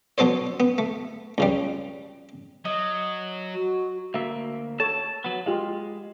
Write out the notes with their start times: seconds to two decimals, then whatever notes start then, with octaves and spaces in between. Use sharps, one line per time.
0.18 F#3 B3 A4 C5 C#5
0.60 B3
0.78 A3
1.38 C#2 C#3 G3
2.65 F#3 D#5
3.54 F#4
4.14 D2 A#3 E5
4.80 A4 C#5 A5
5.24 F#3 B3
5.46 G#3 F4 G4 F5